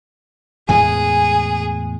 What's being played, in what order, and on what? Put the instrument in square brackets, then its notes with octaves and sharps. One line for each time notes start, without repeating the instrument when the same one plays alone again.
[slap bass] E2 A2 G#3 [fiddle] G#4 [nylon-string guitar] G#5